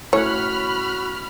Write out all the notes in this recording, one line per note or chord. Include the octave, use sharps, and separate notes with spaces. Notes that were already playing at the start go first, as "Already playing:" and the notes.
A2 C#4 F#4 C#5 F#5 B5 F6